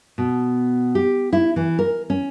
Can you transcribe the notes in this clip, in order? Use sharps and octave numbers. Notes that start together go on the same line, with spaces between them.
B2
G4
E4
E3
A#4
C#4